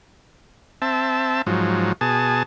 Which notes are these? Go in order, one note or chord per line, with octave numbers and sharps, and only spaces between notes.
C4 E5 A5
G#2 F3 F#3
B2 G#4 A5